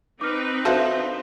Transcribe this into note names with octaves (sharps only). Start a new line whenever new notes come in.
C4 D#4 B4 D6 F6
D3 F3 F#4 C5 E5 F5